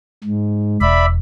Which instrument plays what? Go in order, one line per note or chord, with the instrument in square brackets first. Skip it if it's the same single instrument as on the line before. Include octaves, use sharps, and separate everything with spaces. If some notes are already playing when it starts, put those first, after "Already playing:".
[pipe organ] G#2
[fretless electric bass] E1 [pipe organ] D5 E5 B5